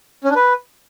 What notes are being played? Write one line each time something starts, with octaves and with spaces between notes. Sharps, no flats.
C#4
D4
B4